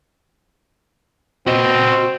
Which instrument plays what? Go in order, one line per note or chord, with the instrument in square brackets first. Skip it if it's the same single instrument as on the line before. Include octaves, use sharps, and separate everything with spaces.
[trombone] C4 [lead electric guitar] F#4 D#5